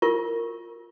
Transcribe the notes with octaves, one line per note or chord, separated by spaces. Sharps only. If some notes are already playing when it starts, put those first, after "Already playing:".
F4 A#4 C#6